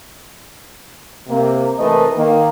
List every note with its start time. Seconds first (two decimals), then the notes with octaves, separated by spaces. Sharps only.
1.27 C3 A#3
1.79 C3 E3 A3 A#4 B4 D#5
2.16 D#3 A#3